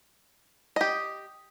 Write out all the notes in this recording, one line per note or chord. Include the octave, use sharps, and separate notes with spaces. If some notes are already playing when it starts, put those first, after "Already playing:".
G4 D#5